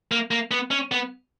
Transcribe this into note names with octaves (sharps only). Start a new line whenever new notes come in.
A#3
A#3
B3
C#4
B3